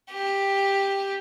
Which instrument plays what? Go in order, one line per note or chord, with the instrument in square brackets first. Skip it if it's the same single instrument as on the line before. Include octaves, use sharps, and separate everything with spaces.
[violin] G4